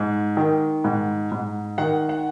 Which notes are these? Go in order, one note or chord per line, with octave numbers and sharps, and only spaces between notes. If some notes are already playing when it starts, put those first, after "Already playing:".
Already playing: G#2
D#3
G#2
G#2
D#3 F#5
F#5